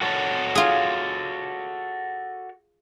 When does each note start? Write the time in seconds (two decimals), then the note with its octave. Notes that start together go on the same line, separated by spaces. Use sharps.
0.01 F#4 A4 C#5
0.55 F4 G#4